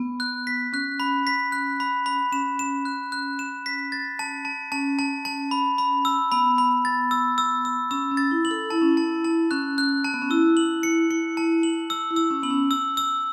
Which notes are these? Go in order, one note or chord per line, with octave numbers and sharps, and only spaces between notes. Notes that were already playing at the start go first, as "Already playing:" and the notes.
Already playing: B3
F#6
B6
C#4 F#6
B5
B6
F#6
B5
B5
C#4 E7
E7
F#6
F#6
E7
B6
A6
A5
A5
C#4 A5
A5
A5
B5
B5
E6
B3 B5
B5
A6
E6
E6
E6
C#4 E6
C#4
A6
E4
F#7
A4
E4 A5
C#4
E4
A5
A5
C#4 F#6
F#6
A5
B3
C#4
E4 E6
F#7
C#7
E4 C#7
A5
F#7
E6
E4
E6
C#4
B3 F#7
C#4
E6
E6